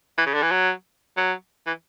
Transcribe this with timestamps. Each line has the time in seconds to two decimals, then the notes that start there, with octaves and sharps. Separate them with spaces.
0.18 E3
0.26 C#3
0.34 D3
0.42 E3
0.51 F#3
1.17 F#3
1.67 E3